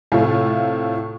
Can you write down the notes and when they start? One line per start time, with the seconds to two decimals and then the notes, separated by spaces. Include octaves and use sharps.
0.12 A2 C3 A3 F4